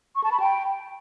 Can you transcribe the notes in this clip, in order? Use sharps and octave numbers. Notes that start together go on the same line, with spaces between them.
C#6
A5
B5
G5